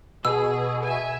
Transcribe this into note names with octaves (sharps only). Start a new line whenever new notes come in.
B2 G#4 E6
E5 G#5